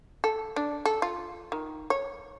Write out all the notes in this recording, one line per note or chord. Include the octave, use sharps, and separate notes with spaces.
A4
D4
A4
F4
D#3
C#5